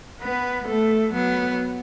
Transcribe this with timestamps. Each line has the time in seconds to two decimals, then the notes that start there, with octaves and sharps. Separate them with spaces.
0.21 B3 B4
0.67 A3 A4
1.13 F#3 B3